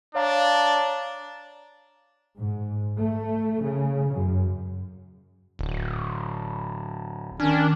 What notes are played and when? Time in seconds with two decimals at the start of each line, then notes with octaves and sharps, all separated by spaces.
0.15 D4 C#5 F5 A#5
2.36 G#2
2.97 A3
3.63 C#3
4.13 F#2
5.59 D1
7.40 D#3 C#4 D4